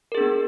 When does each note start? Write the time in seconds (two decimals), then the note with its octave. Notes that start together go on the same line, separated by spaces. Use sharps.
0.12 A#4
0.15 G#4
0.18 D4
0.20 B3